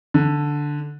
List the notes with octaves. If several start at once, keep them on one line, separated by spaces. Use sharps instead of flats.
D3